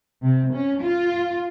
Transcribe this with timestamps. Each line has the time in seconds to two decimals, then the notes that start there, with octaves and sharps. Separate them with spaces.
0.23 C3
0.54 C#4
0.85 F4